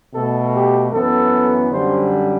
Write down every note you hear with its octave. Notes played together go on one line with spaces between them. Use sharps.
B2 A3 A4
G4
F#2 E3 B3 A4
F#2 D3 G3 C5